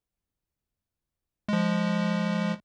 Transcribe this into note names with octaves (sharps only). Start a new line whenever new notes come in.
F3 G#3